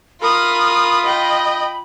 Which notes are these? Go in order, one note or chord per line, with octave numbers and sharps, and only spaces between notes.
F4 A#4 B5 D#6
D#5 G5